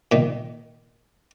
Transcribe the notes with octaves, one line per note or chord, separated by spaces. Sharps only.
A#2 D#3